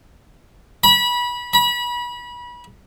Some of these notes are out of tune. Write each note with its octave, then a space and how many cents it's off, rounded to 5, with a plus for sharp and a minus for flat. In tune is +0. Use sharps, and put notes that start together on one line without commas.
B5 -25
B5 -30